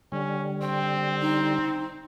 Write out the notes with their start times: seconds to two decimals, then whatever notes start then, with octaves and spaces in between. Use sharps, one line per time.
0.12 D3 G3 C#4
0.61 C4 G5
1.20 D#4